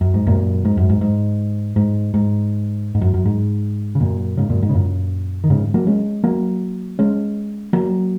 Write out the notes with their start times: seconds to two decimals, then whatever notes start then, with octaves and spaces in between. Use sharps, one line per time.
0.01 F#2
0.14 G#2
0.27 F#2 A#2
0.65 G#2
0.77 F#2
0.90 G#2
1.01 G#2
1.76 G#2
2.14 G#2
2.95 G#2
3.01 F#2
3.14 F#2
3.25 G#2
3.95 C#3
4.00 F#2 A#2
4.37 G#2 C#3
4.50 F#2 A#2
4.62 G#2
4.69 C#3
4.74 F#2 A#2
5.44 D#3
5.50 G#2 C#3
5.74 F#3 A#3
5.87 G#3 C#4
6.24 F#3 A#3
6.99 G#3 C#4
7.73 F#3 A#3